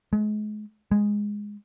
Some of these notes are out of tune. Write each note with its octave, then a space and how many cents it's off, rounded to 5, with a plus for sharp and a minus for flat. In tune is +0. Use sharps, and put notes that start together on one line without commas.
G#3 +35
G#3 -5